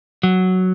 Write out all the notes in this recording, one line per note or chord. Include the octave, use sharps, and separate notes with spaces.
F#3